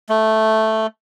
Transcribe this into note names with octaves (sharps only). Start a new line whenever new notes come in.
A3